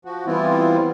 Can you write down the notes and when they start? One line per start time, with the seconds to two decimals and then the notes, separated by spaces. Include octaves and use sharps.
0.05 F3 F#4
0.26 E3 G3 B3 C4 E4 F4